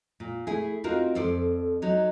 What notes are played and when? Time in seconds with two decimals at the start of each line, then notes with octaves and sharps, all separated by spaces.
0.20 A#2
0.47 A3 E4 G#4
0.84 C4 D#4 F4 F#4 A#4
1.15 F2 A4 C5 D5
1.82 F#3 D#4